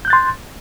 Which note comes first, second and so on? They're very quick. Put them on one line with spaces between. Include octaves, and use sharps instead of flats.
G6 F#6 A6 C6